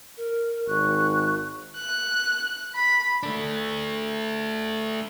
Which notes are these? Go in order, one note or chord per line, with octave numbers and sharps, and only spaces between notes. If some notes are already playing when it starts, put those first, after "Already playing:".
A#4
G#1 C#6 F#6
F#6
B5
A3 D4